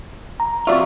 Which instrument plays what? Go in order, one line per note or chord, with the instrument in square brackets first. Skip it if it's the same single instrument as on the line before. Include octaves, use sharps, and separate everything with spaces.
[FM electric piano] A#5
[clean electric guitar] F2 F4 [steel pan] F#4 D5 E5 [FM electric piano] C#6